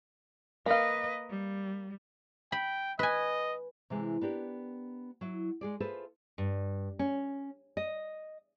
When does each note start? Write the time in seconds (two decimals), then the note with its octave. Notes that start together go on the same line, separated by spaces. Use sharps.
0.66 A#3 B4 D#5 F5
1.30 G3
2.52 G5 B5
2.99 B4 D#5 G#5
3.90 C3 E3 G#3
4.21 B3 D4 G4 A#4
5.21 F#3 E4
5.61 G#3 G#4 D5
5.80 F4 G#4 A4 B4 C5 E5
6.38 G2
6.99 C#4
7.77 D#5